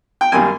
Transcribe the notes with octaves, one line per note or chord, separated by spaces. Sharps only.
G5
F#2 D#3 G3 A#3 G#5